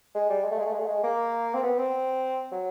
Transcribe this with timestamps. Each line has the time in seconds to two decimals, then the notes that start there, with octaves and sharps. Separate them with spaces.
0.15 G#3
0.29 G3
0.44 G#3
0.51 A3
0.58 G#3
0.66 A3
0.73 G#3
0.80 A3
0.87 G#3
1.04 A#3
1.54 C4
1.63 B3
1.78 C4
2.52 F#3